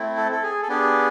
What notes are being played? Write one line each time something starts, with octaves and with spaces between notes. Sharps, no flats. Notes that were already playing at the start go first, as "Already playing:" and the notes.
Already playing: A3 C4 E4
A4
A4
G#4
A4
B3 D4 G4 G#4